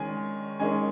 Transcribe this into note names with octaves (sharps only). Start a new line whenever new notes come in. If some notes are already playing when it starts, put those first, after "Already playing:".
Already playing: D#3 G#3 C#4 G#5
D#3 G#3 C#4 G#5